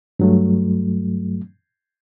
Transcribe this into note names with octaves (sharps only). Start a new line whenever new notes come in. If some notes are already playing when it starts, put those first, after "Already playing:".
G2 F#3 A3